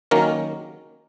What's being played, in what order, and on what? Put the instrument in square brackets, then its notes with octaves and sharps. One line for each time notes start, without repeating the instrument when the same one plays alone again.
[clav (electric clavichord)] D#3 F#3 A#3 C#4 A#4